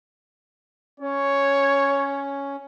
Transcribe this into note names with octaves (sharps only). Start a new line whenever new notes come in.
C#4 C#5